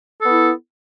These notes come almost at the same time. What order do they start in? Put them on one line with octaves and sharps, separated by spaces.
A4 B3 E4